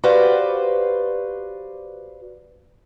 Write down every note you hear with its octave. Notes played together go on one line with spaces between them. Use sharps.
F#4 G4 B4 C5 D5 F5